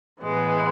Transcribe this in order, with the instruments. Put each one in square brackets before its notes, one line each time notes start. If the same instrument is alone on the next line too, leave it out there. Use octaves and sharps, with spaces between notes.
[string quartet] A2 E3 G#3 B3